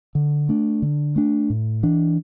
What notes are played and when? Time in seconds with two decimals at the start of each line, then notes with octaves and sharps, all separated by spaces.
0.15 D3
0.49 A3 D4
0.82 D3
1.16 A3 D4
1.50 A2
1.83 E3 D4